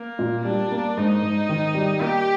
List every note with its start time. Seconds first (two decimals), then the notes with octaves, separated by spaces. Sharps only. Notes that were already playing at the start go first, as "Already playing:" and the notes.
Already playing: A#3
0.19 A#2
0.45 G3 D4
0.72 A#3
0.97 G#2 D#4
1.23 G#2
1.49 D#3
1.75 G3
2.01 A#3 G4